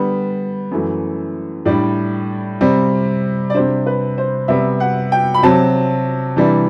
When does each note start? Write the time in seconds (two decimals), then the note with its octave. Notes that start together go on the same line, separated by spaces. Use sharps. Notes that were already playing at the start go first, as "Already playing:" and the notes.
Already playing: D3 G3 B3
0.71 F#2 E3 A3
1.66 A2 G3 D4 D5
2.61 C3 G3 C4
3.50 D5
3.54 C3 G3 D4 C5
3.86 B4
4.18 C5
4.48 C3 G3 B3 E5
4.80 F#5
5.12 G5
5.34 B5
5.43 C3 F#3 C4 A5
6.36 C3 E3 G3 D4